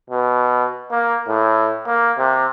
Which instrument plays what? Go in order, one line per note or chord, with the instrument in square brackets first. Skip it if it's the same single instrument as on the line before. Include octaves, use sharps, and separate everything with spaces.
[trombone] B2
A#3
A2
A#3
C3